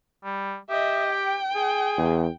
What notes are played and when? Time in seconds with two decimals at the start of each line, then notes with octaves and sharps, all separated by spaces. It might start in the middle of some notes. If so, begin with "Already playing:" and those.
0.24 G3
0.70 G4 D#5 E5
1.11 G5
1.56 G#4
1.98 E2